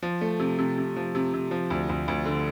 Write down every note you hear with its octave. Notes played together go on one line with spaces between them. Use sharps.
F3
A3
C3
C3
C3
F3
C3
C3
F3
D2
D2
D2
D3